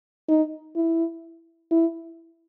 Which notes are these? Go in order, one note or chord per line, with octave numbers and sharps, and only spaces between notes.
D#4
E4
E4